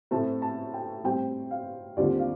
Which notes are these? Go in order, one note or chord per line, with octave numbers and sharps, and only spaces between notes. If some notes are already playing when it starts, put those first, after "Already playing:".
A2 A3 C4 A5
A5
G5
A2 G3 C4 G5
F5
D#2 D3 G3 C4 F4 D5
F5